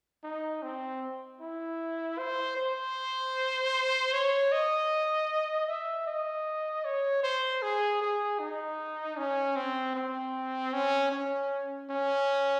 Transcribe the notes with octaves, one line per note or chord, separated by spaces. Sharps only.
D#4
C4
E4
C5
C5
C#5
D#5
E5
D#5
C#5
C5
G#4
G#4
D#4
C#4
C4
C4
C#4
C#4
C#4